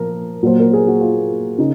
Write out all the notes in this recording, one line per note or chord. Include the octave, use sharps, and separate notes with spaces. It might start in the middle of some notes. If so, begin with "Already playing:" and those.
Already playing: A#2 F3 A#4
A#2 F#3 A#3 C5
A#4
G#4
F#4
F4
C#3 D#4